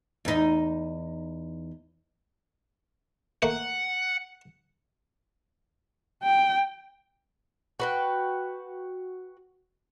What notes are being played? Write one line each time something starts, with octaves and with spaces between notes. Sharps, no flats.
E2 D#4
A3 A#3 F#5
G5
F#4 B4 G5